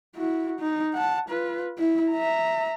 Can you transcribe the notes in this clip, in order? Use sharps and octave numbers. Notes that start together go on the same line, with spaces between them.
E4 F#4
D#4
F#5 A5
F4 B4
E4
E5 A#5